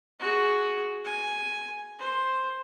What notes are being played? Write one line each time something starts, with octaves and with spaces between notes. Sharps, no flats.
F#4 G#4
G#5
C5